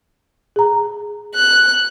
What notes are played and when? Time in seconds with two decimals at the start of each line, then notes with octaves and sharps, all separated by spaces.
0.56 G#4 A#5
1.35 F#6